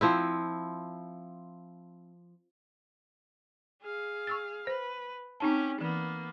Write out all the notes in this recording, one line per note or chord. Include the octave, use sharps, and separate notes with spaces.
F3 C4 E4
G#4 F5
C#6 E6 A6
B4 C5
C4 C#4 D#4 G4 A5
E3 A#3 B3